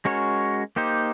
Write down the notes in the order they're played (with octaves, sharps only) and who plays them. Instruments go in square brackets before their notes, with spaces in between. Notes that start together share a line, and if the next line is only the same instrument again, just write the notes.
[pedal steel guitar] G#3 C#4 F#4 A#4 C#5
A#3 D#4 G4 C5